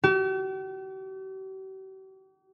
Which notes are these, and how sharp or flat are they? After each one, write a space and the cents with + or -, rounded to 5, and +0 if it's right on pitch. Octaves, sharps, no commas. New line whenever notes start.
G4 -45